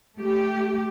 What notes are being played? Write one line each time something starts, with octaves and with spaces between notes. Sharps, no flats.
A3 G4